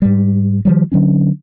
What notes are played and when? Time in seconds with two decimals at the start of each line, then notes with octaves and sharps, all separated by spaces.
0.02 G#2 G3
0.65 D#3 F3 G3
0.92 D3 F#3 C#4 D4